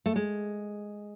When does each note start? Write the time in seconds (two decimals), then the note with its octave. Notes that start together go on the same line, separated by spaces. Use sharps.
0.06 A3
0.16 G#3